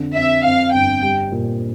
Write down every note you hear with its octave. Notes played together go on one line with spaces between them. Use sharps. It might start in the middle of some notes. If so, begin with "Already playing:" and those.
Already playing: F2 D3
F2 E5
F2 F5
G1 G5
G3
A#2